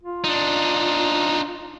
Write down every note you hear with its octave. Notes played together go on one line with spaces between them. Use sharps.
F4
D4 D#4